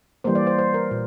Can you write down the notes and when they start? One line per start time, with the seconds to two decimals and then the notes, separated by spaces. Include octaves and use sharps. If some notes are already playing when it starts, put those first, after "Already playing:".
0.24 E3 G3 A#3 C5
0.35 D5
0.47 C5
0.59 C5
0.74 A#4
0.91 A#2